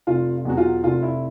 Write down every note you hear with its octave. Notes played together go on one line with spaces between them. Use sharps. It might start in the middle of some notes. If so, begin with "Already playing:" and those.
F1 F4
E2 B2 F#3 F#4
F4
F1 F4
E4